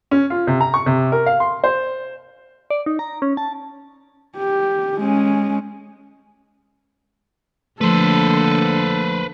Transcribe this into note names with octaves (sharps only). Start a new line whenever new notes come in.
C#4
F4
C3
A#5
C#6
C3
A#4
F5
C6
C5
D5
D#4
A#5
C#4
A5
G4
G#3 C#4
D3 F3 A3 A#3 A4 B4 C5